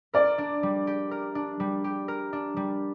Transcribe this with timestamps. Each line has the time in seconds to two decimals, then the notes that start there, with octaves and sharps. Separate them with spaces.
0.14 A#4 D5
0.38 D4
0.63 G3
0.87 G4
1.11 A#4
1.35 D4
1.60 G3
1.84 G4
2.08 A#4
2.33 D4
2.56 G3